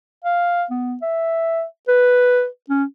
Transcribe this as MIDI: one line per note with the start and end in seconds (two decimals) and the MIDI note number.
0.24 0.65 77
0.71 0.95 59
1.02 1.63 76
1.88 2.46 71
2.70 2.84 61